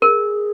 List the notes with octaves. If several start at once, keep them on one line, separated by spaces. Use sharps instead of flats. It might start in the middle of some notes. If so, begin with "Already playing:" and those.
G#4 A#4